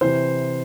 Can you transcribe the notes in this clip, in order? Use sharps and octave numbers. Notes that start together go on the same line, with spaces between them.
C3 E3 C5